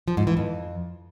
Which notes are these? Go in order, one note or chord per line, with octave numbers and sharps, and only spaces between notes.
F3
G#2
E3
F2